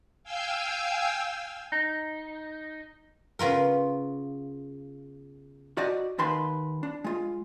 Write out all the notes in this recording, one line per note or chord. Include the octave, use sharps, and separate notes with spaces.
F5 G5 G#5 E6 G6
D#4
C#3 B3 F4 A#4
F#4 D5 D#5
D#2 D#3 B4 C6
D4
G#3 F4